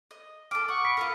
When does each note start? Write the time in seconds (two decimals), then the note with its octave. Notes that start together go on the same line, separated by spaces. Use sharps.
0.11 D#5
0.51 A4 D6 F6
0.68 F#5 C#6 D#6
0.84 B5 B6 D7
0.97 F4 A4 A#4 F6